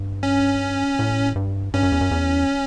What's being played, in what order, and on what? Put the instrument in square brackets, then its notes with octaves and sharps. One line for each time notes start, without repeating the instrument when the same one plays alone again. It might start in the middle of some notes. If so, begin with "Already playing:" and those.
Already playing: [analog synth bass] G2
[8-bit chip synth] C#4
[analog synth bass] A2
G2
[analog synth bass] G2 [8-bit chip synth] C#4
[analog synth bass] F#2
E2
F#2
E2